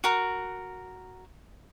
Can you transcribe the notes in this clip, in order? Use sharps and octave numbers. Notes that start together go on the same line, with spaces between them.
F#4 A#4